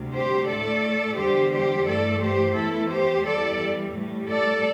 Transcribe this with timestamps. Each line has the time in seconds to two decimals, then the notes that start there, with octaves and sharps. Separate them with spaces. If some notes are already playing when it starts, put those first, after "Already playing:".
Already playing: D2 C3 G3
0.13 G4 C5
0.47 A2 A3 A4 D5
1.17 E2 D3 G3 G4 C5
1.52 G4 C5
1.86 G2 E3 A3 A4 D5
2.21 G4 C5
2.55 E2 E3 A3 E4 A4
2.90 G4 C5
3.25 E2 E3 G3 A4 D5
3.94 A2 G3
4.28 A4 D5